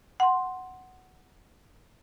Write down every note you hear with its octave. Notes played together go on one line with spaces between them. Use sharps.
F#5 C6